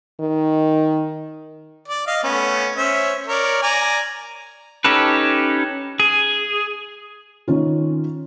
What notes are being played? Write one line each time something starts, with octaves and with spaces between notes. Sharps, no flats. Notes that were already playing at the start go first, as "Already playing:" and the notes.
D#3
D5
D#5 F5
A3 B3 C#4
C#4 C5 E5
A#4 C#5 D5
D5 G#5 A#5
C#4 D#4 G4 A4 B4
G#4
D#3 C#4 F4